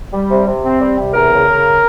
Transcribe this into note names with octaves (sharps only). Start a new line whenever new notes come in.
G3
C3
C3
C4
G3
C3
E2 A#4
C#3
C#3